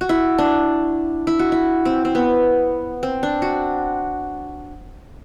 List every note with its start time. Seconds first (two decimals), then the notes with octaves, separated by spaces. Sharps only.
0.01 F#4
0.09 E4
0.38 D4
1.27 E4
1.39 F#4
1.52 E4
1.85 C4
2.05 C4
2.15 B3
3.03 C4
3.23 D4
3.42 F#4